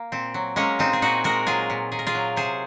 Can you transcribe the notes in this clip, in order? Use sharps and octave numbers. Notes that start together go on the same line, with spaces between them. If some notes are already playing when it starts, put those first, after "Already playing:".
Already playing: A#3
A#2 C4
F#3
G#3 A#3 C#4
A#2 C4 D#4
G#4
A#2 D#4 F#4
G#3 F#4 A#4
F#3 F4 G#4
A#2
A#2 G#4
A#4
F4 G#4
F#3
C3 G#4 C5